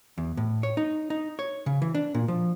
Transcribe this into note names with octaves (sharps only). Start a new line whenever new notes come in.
E2
A2
C#5
D#4
D#4
C#5
C#3
E3
D4
A#2
F3